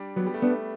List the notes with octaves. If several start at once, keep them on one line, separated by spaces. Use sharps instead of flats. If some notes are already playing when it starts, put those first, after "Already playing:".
Already playing: G3 D4
F#3 B3
G3
A3
B3 D4
A3